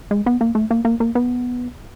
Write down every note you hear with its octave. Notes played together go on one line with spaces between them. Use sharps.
G#3
B3
A#3
A3
A#3
A#3
A#3
B3